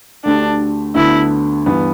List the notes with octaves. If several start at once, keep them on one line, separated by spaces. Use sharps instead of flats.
D2 D3 A3 D4 G4
D2 D3 B3 E4
G2 E3 B3